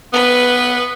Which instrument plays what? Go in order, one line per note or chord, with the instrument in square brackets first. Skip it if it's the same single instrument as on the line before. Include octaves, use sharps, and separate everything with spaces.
[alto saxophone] B3 [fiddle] B4